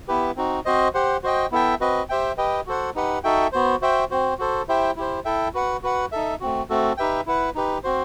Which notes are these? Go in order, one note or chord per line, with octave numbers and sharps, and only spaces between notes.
B3 E4 G4 B4
C4 D#4 F#4
C4 F#4 C5 D#5
G4 C5 F#5
F#4 C5 D#5 G5
B3 E4 A4 E5 G5
C4 F#4 B4 D#5
G4 C5 E5 G5
G4 B4 D#5 G5
F#4 A4 C5 F#5
D#4 G4 B4 F#5
D#4 F#4 A4 E5 G5
B3 F#4 C5
F#4 C5 E5 G5
C4 F#4 C5
F#4 A4 C5
E4 G4 C5 E5 G5
E4 G4 C5
E4 A4 E5 G5
F#4 B4 F#5
F#4 B4 F#5
D#4 A4 E5
A3 C4 F#4
A3 C4 F#4 A4
D#4 G4 B4 E5 G5
E4 B4 F#5
D#4 G4 B4
C4 F#4 C5